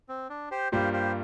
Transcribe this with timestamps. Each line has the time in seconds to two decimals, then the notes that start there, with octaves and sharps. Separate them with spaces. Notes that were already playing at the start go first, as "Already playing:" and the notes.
0.09 C4
0.30 D4
0.51 G4 C5
0.72 G2 G3 A#3 F4 G4 C5
0.93 G4 C5